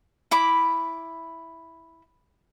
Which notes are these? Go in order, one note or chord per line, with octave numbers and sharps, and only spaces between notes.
E4 B5 D6